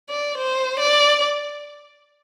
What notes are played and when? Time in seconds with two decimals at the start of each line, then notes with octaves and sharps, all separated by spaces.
0.09 D5
0.38 C5
0.80 D5